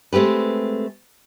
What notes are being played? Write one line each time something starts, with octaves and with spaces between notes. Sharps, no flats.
G#3 A3 C4 G4 B4